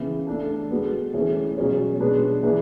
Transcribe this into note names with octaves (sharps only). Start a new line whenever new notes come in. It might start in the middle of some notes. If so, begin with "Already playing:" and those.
Already playing: C#3 E3 B3
A3 D4 A4
G#3 B3 F#4 B4
E3 A3 C#4 G#4
B2 F#3 C#4 G#4 C#5
B2 G#3 D4 G#4 B4
E3 B3 D4 G#4 B4